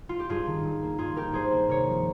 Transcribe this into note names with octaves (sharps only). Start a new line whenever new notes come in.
F4
G4
G2 F4 G#4
D#3
G2
A#3
G2 F4 G#4
D#3 G4 A#4
G2 G#4 C5
A#3
C3 A#4 C#5
F3